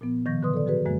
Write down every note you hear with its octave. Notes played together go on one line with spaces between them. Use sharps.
A#2 F3 B3
B2 D#3 F3 C#6 G6 A#6
A2 D3 F#3 B4 C6 D#6
A4 D5
F3 F#4 G#4 B4
F#2 D3 E3 G#3 A#3 F#4